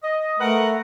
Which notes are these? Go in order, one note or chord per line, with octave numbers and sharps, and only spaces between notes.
D#5
A3 A#4 B4 F#5